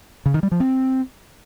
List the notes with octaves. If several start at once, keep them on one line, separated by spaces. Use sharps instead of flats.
C#3
D#3
G3
F3
C4